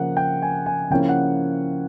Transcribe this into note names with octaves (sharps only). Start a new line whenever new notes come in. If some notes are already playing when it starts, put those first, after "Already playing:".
Already playing: C#3 F3 A#3 F#5
G5
G#5
G#5
C#3 F3 A#3 C#4 E4 G5
F#5